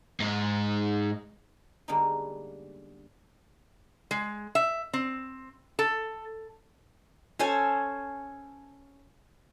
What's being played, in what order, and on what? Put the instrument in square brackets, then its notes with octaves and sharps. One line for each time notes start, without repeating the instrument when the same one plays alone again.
[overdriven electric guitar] G#2 D#4
[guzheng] D3 G3 G#3 A#3 B3 D#4
[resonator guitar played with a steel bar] G#3
E5
C4
A4
[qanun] C#4 A4 C5 G#5